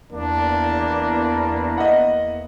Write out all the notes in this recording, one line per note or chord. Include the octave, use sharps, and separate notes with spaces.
E2 A#3 D4
D#5 E5 F#5